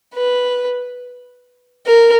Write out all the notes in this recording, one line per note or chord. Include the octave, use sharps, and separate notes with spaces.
B4
A#4